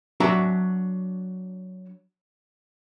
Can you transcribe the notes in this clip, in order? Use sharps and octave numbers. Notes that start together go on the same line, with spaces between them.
F#3 D4 F#4 E5 A#5